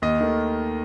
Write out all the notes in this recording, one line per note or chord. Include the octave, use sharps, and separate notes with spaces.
D#2 D#5
D#3 A3